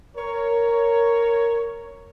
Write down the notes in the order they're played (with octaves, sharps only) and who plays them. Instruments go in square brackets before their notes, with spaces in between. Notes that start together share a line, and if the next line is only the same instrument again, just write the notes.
[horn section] A#4 C#5